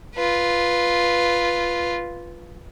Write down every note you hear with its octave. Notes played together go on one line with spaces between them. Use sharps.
F4 B4